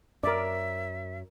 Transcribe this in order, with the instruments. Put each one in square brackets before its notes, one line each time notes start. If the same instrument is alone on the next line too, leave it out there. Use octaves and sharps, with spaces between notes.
[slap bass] F#2 [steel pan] A#4 D5 [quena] E5